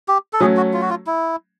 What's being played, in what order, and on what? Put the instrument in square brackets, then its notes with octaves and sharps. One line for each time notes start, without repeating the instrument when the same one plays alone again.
[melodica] G4
A4
[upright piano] F#3 A3 C#4 [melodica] G#4
[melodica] F#4
F4
F#4
F4
E4